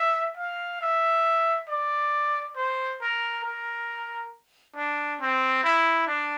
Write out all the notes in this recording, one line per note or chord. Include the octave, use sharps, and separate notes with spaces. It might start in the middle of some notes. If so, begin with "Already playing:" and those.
Already playing: E5
F5
E5
D5
C5
A#4
A#4
D4
C4
E4
D4